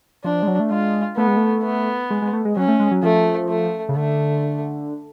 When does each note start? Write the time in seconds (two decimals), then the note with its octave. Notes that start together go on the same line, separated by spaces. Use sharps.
0.24 F3 D4
0.43 G#3
0.48 F#3
0.60 A3
0.71 G#3 F4
1.17 A3 B3
1.27 G#3
1.37 A3
1.64 B3
2.10 G#3
2.22 G#3
2.33 A3
2.45 G#3
2.56 F#3 C#4
2.68 A3
2.80 G#3
2.91 F#3
3.03 F3 A3
3.49 A3
3.89 C#3
3.96 D3 A3